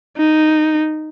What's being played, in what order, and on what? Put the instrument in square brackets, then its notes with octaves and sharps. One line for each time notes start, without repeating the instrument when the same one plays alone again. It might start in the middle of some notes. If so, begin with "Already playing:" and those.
[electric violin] D#4